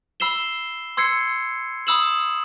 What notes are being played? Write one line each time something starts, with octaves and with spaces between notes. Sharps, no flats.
B5 E6 C7 E7 G7
C6 E6 G#6 C7 C#7
B5 D#6 E6 E7 F#7